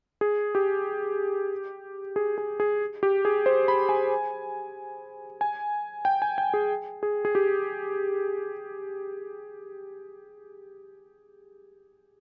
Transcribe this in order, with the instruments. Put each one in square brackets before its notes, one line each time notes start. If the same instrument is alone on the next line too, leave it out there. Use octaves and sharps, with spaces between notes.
[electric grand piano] G#4
G4
G#4
G#4
G#4
G4
G#4
C5
B5
G#5
G#5
G5
G#5
G5
G#4
G#4
G#4
G4